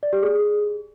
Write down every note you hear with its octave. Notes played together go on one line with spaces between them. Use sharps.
D5
G4
G#4